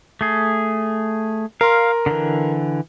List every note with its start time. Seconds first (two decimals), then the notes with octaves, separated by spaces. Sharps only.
0.21 A3 G#4
1.61 A#4 F5 C6
2.06 D3 E3